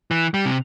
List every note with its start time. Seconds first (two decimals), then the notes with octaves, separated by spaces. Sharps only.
0.11 E3
0.34 G3
0.46 C3